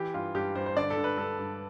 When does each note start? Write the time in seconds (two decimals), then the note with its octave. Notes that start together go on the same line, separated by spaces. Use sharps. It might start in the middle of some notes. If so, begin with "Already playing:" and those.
Already playing: E3 G4
0.14 G2 F4
0.35 G2 G4
0.55 G2 C5
0.66 C5
0.77 D3 D5
0.90 A4
0.97 D3
1.04 B4
1.18 G2 A4
1.38 G2